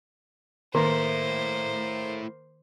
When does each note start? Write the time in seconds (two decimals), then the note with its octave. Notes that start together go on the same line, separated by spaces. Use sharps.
0.75 D#3 A3 A#3 E4 C5